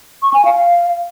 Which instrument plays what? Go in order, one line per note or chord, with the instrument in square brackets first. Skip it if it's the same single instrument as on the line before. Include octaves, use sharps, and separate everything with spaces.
[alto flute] C#6
G#5
F5